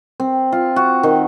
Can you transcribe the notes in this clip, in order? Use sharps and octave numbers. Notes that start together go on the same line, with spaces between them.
C4
F4
F#4
D#3